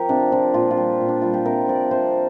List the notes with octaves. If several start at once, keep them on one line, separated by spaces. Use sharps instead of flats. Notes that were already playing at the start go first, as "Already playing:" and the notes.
Already playing: F3 G4 A#4
C3 D4
F3 D4
A#2 F4
F4
G3 G4
A#2
D4
G3 F4
G4
C3 A#4
F3 D5
C3 C5